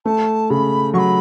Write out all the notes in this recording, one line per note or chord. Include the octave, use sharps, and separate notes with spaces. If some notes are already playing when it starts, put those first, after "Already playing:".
A3 A5
C#3 B5
F#3 B5 C#6